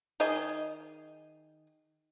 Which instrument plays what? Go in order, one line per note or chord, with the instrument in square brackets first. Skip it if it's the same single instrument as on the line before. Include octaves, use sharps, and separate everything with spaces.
[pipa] D#3 G#4 D#5